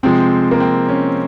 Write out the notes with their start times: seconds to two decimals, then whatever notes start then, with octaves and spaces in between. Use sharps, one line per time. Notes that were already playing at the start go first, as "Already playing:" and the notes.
0.03 C3 F3 G#3 C4
0.51 A#3
0.60 C4
0.89 C#4